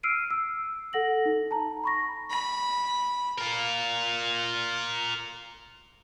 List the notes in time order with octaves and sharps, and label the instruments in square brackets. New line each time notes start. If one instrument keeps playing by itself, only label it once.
[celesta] E6 F6 C7 D7 D#7
E6
A4 F#5 A#6 F#7
D#4
A5 A#5
B5 C#6 A#6
[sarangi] B5
[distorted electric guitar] F4 A#4